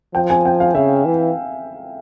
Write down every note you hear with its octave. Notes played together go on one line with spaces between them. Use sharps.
F3 G5
G#5
G5
F5
C#3 E5
E3